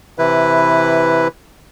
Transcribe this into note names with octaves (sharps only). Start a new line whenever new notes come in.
C3 E3 E4 B4